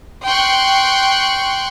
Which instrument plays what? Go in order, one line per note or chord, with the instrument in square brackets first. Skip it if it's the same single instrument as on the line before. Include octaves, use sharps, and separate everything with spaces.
[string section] G5 C6 C#6 F#6